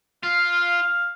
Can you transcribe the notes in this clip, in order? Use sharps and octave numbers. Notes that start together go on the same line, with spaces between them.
F4 F5